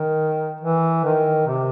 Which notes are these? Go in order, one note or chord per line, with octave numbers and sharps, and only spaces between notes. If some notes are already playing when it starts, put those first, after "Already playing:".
Already playing: D#3
E3
D#3
C3